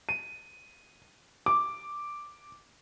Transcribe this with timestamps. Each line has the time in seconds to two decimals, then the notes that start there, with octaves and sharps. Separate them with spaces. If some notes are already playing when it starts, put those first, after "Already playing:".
0.09 D#7
1.46 D6